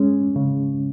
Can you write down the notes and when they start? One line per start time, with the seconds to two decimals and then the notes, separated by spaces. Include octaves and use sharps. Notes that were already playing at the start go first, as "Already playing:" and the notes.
Already playing: G#3 C#4
0.36 C#3